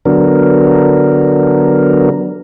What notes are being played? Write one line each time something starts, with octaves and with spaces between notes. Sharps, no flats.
D3 F#3 B3 D4 A#4